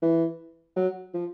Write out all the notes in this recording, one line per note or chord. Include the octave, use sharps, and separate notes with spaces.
E3
F#3
F3